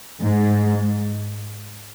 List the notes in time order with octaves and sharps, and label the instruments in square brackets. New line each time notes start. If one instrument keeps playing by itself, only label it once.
[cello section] G#2